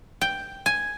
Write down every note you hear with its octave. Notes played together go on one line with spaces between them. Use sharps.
G5
G#5